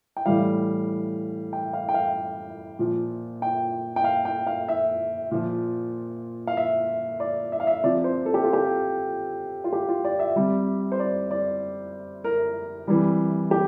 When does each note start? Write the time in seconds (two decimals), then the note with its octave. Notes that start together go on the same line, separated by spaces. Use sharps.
0.17 G5
0.26 A2 E3 G3 F5
1.53 G5
1.73 F5
1.89 G5
1.94 F5
2.79 A#2 F3
3.42 G5
3.96 G5
4.04 F5
4.25 G5
4.47 F5
4.68 E5
5.31 A#2 F3
6.47 F5
6.57 E5
7.20 D5
7.52 E5
7.60 F5
7.67 E5
7.84 C3 F3 D5
8.04 C5
8.26 A4
8.34 G4
8.44 F4
8.53 G4
9.64 F4
9.73 G4
9.89 F4
10.04 D5
10.19 E5
10.36 C3 G3
10.92 C5
10.99 D5
11.31 D5
12.24 A#4
12.88 C3 E3 G3
13.51 G4